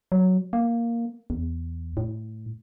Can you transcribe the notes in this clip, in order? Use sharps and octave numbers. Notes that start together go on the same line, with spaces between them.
F#3
A#3
E2
A2